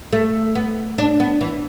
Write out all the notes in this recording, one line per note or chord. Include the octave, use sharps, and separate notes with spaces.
A3
B3
D4
B3
E3